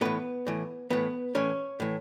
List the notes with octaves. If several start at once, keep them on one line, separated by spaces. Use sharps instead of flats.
A2 E3 B3 B4
A2 E3
A2 E3 B3 B4
A2 E3 C#4 C#5
A2 E3